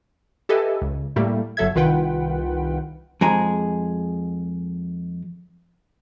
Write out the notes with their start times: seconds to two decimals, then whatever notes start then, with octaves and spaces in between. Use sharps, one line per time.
0.49 G4 A4 B4 D#5 E5 G#5
0.82 C#2
1.16 A2 G3 A3 A#3
1.57 G1 F#3 A4 E5 G#6
1.75 C2 D#3 F4 B4 F#5 G5
3.21 F2 G#3 G#4 A#5